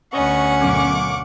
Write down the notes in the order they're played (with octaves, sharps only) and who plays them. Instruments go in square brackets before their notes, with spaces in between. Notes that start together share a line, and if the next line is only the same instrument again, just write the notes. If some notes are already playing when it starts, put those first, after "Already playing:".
[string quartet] D2 F#5 [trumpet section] B3 D#5 C#6 [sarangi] C#4
[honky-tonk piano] F#2 B2 [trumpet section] F5 C#6 D6